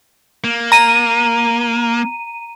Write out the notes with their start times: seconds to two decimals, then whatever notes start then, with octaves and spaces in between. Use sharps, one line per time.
0.44 A#3
0.72 A#5 D#7